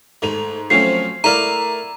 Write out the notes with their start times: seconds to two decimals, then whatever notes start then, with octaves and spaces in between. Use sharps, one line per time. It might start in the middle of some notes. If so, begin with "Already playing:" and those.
0.22 G#2 A3 F7
0.70 F3 F#3 A3 C4 C#4 C7
1.24 A3 E4 A#4 D5 F5 A#5